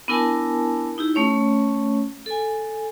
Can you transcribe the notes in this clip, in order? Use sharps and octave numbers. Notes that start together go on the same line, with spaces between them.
B3 D4 E4 A#4 G#5 A5
D#4 E4 G4
A3 C#4 C#5
A4 G#5